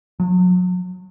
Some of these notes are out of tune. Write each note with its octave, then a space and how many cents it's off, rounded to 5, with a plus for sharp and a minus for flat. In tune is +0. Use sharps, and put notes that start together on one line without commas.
F#3 -35